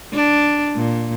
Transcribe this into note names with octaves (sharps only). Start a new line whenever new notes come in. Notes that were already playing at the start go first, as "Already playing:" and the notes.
D4
A#2